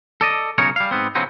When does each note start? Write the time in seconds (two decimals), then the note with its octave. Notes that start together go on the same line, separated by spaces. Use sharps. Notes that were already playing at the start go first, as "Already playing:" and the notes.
0.21 A4 D5 D#5
0.58 B1 C#3 C#4 D#4 A#4 C#5
0.76 G3 F5
0.91 G#2 B3 C4
1.15 C#3 F3 F#3 B3 C4 D#4